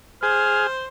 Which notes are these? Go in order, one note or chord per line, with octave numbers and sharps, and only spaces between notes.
G#4 C5 F6